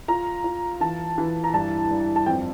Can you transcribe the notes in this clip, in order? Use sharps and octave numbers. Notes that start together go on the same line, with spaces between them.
F4 A#5
F4
E3 A5
E3
A#5
G2 A5
G2
A5
F2 G5